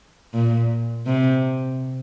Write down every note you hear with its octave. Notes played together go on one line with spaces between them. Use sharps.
A#2
C3